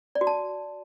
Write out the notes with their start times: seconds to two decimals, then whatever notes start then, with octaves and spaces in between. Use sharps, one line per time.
0.15 D5
0.21 F#4
0.27 A5